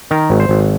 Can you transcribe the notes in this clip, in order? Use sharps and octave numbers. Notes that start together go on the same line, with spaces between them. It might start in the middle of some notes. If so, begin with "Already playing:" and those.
D#3 A#4
G#1
C5
G#1